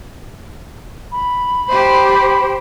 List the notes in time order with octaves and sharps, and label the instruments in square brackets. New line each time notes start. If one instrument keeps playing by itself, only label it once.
[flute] B5
[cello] G4 C5